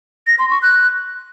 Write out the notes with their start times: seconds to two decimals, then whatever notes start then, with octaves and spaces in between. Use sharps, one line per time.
0.27 A#6
0.39 C6
0.50 C#6
0.62 F#6